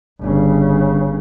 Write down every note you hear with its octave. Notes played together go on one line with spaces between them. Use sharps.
G1 C#3